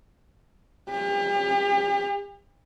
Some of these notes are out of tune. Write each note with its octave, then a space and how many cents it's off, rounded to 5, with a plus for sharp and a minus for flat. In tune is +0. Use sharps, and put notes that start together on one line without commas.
G4 +40